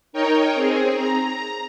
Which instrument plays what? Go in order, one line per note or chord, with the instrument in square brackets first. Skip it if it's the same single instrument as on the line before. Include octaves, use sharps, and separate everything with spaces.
[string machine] D#4 A#4 C#5 G5
C4 G#4
A#5